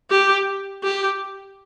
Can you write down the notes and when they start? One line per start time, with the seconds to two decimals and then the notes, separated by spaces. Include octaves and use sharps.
0.10 G4
0.83 G4